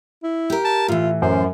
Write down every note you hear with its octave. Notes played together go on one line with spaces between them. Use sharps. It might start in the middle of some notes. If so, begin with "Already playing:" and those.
E4
G4 A#4
A5
A2 E3 F4
F#2 C5